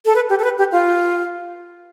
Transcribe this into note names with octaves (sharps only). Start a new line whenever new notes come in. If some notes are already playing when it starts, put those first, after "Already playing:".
A4
B4
G4
A4
B4
G4
F4